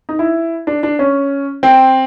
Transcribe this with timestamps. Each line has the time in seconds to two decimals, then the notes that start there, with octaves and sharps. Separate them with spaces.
0.09 D#4
0.19 E4
0.67 D4
0.83 D4
0.99 C#4
1.63 C4